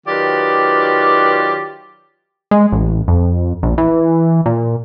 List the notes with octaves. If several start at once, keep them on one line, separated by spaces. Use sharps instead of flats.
D#3 F#3 F4 G4 B4 D5
G#3
A1
F2
A#1
E3
A#2